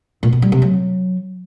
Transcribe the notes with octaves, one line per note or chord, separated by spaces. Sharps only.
A#2
B2
G3
C3
F#3